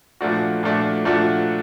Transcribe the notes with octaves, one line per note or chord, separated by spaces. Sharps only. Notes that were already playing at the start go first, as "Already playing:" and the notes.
A#2 F3 A3 D4 F#4
A#2 F3 A3 D4 F#4
A#2 F3 A3 D4 F#4